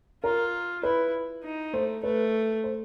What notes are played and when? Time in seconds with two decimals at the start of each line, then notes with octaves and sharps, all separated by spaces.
0.23 F4 A#4
0.83 E4 B4
1.44 D#4
1.73 A3 C5
2.03 A3 B4
2.64 C5